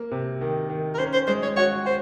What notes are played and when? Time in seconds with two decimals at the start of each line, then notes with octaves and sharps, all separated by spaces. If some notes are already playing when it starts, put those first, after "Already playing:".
Already playing: A#3
0.11 C3
0.41 D#3
0.70 D#3
0.95 A#4
0.99 C#4 C5
1.13 C5
1.27 G#3 C5
1.42 C#5
1.56 F#4 C#5
1.86 F#4 C5